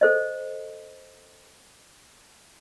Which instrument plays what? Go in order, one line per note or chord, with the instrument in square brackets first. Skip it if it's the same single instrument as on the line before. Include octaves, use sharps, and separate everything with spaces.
[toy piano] A4 C5 D#5